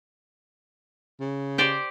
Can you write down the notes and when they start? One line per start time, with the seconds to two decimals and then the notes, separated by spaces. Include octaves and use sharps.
1.20 C#3
1.58 G4 C5 D5